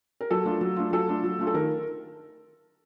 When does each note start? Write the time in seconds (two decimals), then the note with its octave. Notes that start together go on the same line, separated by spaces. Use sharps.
0.21 A#4
0.31 F#3 A4
0.45 A3 D4 F4
0.61 F#3
0.76 A3 D4 F4
0.93 F#3 A4
1.08 A3 D4 F4
1.24 F#3
1.39 A3 D4 F4
1.47 A4
1.54 D#3 A#4